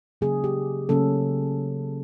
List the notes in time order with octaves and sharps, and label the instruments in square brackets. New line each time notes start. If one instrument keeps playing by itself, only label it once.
[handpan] C#3 F#3 A#3 C#4 G#4
G4
C#3 F#3 A#3 C#4 A4